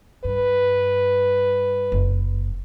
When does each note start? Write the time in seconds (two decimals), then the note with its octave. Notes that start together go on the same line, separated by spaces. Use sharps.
0.24 G2 B4
1.92 F#1